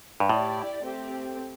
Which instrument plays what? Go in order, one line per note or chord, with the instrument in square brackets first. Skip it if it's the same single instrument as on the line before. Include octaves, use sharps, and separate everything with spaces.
[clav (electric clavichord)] G2
[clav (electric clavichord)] A2 [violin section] E4 G4 D5
[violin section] A3 C4 G4